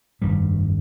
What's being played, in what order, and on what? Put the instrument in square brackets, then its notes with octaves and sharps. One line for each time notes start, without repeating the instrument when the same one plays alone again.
[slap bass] F1 G2 D#3 G3